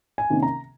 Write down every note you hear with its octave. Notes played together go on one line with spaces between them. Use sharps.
G#5
C3 D#3 A#3 C#4
A#5